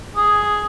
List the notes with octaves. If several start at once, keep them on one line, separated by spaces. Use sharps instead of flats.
G#4